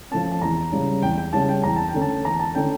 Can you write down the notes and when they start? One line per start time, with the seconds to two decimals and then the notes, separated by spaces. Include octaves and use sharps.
0.11 F3 A3 C#4 A5
0.32 A5
0.42 E2 A#5
0.72 C#3 G3 C#4
1.02 E2 G5
1.18 G5
1.33 C#3 G3 C#4 A5
1.49 G5
1.64 E2 A#5
1.76 A5
1.89 G5
1.94 D3 A3 C#4
2.01 A5
2.24 E2 A#5
2.39 A5
2.55 D3 A3 C#4 G5